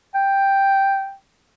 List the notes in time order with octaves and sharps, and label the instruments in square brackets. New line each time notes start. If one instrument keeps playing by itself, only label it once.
[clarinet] G5